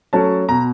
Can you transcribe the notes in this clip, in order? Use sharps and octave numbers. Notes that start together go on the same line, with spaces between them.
F#3 A3 C#4 A5
B2 A#5